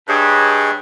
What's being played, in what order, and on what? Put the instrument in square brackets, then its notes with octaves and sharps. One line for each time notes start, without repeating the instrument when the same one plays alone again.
[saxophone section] G2 [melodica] G#4 C#5 D#5